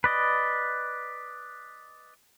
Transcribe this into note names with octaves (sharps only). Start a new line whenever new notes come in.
B4 D5 D#5